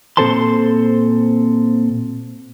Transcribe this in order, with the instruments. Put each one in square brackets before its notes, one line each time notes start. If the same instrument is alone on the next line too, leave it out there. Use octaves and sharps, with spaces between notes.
[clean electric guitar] A#2 C4 A4 C5 A5 C6